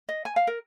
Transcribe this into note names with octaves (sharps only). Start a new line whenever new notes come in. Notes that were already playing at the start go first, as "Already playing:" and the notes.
D#5
G#5
F5
A#4